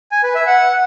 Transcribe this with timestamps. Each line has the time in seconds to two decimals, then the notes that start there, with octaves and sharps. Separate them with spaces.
0.12 G#5
0.23 B4
0.35 E5
0.47 F#5